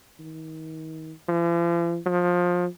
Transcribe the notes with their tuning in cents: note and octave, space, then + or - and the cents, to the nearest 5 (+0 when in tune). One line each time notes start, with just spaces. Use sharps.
D#3 +35
F3 -45
F3 +20